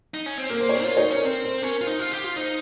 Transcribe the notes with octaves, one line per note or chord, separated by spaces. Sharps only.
D#4
C#4
C4
A#3 A#4
C5
C#5
C5
F4 A#4
D#4 C#5
C5
C#4 A#4
C4 A#4
C5
C#4 A#4
F4 C5
D#4
F4
G4
F4
D#4 C5